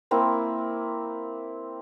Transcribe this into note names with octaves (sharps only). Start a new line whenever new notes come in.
A#3 C4 E4